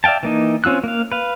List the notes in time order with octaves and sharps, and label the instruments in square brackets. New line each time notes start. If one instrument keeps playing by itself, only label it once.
[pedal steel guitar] D5 E5 F5 G5 A5
E3 A#3 D#4
C4 C#4 F4 E6 F#6
A#3 F5
B4 F5